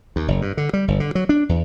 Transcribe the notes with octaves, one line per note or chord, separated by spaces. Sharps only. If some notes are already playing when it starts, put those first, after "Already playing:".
D#2
F#1
G2
D3
G3
G1
D3
F#3
D4
E2